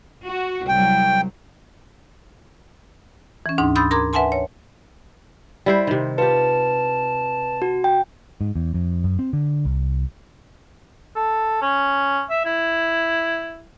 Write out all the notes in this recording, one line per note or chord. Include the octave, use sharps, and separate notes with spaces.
F#4
C2 F#3 G5
E3 C#4
D2 G#2 D4 D#4 C6
B5 C6 D#6 E6 G6 A6
A#4 A#5 C6 D6 G#6
B4 E5 F#5 G#5 A5 C6
C#5
G3 E4 C5
C3 D#3
F4 G4 B4 A5
F#4
G5
G#2
E2
F2
F#2
C4
D3
C2
A4
C#4
E5
E4